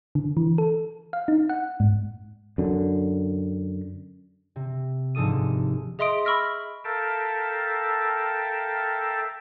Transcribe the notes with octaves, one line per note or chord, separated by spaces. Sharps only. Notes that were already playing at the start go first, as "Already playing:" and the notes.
D3
E3
A4
F5
D#4
F#5
G#2
F#2 D3
C3
G1 G#2 F3 A4 D#6 D#7
G#4 D#5 E5 C6 D#6 D7
B5 C#6 E6 F6 A#6 B6
A4 A#4 E5 F5 G5 A5